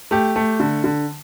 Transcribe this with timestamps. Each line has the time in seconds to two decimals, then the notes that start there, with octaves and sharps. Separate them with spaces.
0.11 A3 G4
0.36 A3
0.60 D3
0.84 D3